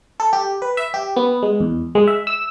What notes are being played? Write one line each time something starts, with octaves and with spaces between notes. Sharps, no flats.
A4
G4
B4
E5
G4
B3
G#3
E2
G#3
E5
E6